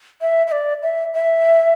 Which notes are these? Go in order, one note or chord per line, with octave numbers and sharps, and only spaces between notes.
E5
E5
D5
E5
E5